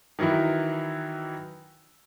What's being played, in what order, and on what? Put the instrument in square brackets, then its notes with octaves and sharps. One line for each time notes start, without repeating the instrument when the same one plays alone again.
[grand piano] D#3 E3 F#3 D#4 E4